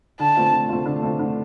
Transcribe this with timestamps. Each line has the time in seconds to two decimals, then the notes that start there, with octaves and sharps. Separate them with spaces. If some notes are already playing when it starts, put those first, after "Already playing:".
0.20 D3 A5
0.36 A3 C4 F4
0.52 D3
0.69 A3 C4 F4
0.85 D3
1.03 A3 C4 F4
1.19 D3